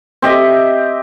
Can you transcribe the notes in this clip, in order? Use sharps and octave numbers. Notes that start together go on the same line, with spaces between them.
C4 G4 D#5 E5